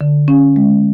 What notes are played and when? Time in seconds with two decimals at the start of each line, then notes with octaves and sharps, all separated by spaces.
0.01 D3
0.28 C#4
0.56 G#3